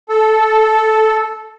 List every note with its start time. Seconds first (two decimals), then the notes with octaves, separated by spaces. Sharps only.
0.09 A4